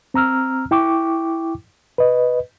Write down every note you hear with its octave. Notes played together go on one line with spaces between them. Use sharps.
C4 A#5 E6 F6
E4 G5 C#6 D6
B4 D#5